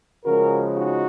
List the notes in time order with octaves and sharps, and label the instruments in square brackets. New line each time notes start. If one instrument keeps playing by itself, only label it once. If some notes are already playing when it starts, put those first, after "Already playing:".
[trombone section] C#3 F3 G#3 F#4 A#4
D#4 F#4